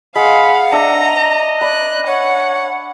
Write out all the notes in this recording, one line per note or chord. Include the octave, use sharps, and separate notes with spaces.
G#3 F5 F#5 B5
D4 D#5 E5 A#5
D5 B5 F#6
C#5 F#5